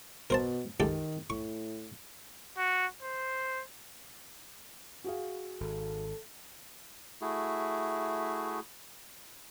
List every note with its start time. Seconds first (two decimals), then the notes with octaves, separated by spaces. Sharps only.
0.30 B2 A#4 C5 A5
0.80 C#2 D#3 G4 A4
1.30 A2 C#6
2.57 F#4
3.02 C5
5.04 F#4 G#4 F5
5.60 G#1 A4
7.21 A3 E4 F#4 G#4